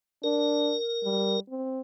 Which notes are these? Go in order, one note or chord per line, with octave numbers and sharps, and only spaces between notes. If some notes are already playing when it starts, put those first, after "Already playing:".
D4 A#4
G3
C4